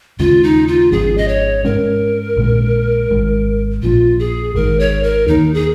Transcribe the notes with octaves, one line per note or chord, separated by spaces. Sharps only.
D#2 C#3 G#3 C#4 F4
D#4
F4
G#1 G#2 F3 C#4 G#4
D#5
C#5
G#2 G#3 C#4 A#4
A#1 A#2 G#3
G#1 G#2 G#3
A#1 A#2 F3 F4
G#4
G#1 G#2 D#3 A#4
C#5
A#4
D#2 D#3 A#3 D#4
G#4